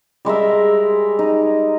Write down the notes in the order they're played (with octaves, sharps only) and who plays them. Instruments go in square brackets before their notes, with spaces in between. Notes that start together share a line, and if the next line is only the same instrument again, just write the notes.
[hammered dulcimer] G3 G#3 A#4 E5
D#4